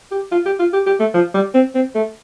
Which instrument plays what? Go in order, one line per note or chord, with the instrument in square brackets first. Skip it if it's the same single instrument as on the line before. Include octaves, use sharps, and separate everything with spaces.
[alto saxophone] G4
F4
G4
F4
G4
G4
A3
F3
G3
C4
C4
A3